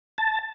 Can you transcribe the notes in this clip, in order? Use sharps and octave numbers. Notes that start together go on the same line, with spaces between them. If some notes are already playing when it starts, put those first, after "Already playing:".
A5